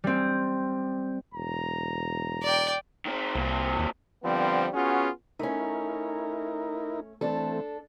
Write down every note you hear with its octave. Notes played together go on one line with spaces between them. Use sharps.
G3 C4
E1 A#5
D5 G5
D#3 C4
C2 A#2 C4
D#2
D3 F3 G3 B3 C4
B3 C#4 F4 F#4 G#4
A3 C#4 D#4 E4 A#4
E3 A3 C4 D4 A4